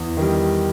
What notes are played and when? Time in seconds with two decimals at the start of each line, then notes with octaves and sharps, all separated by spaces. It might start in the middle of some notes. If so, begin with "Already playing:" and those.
Already playing: E2
0.17 D#3 G3